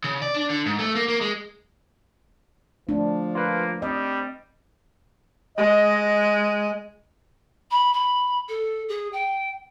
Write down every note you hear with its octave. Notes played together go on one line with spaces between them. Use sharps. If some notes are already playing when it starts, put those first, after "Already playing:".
C#3
D5
D4
D3
G#2
A3
A#3
A#3
G#3
F3 A3 D4
A#3 F4 B4
G3 C4 D#5
G#3 D#5
B5
B5
A4
G#4
G5